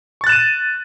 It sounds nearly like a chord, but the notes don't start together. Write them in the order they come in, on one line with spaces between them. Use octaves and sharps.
C#6 A6 F#6 E7 D#7